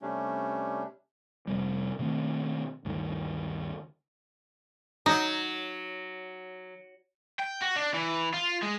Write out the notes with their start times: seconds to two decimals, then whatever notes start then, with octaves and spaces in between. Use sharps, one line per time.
0.02 C3 G3 A3 C#4 D4
1.47 F1 C#2 C3 G3
1.99 B2 D#3 A3 C4
2.85 D2 G2 D3 D#3
5.06 F#3 D#4
7.39 G5
7.62 F#4
7.76 D4
7.94 E3
8.34 F4
8.62 G#3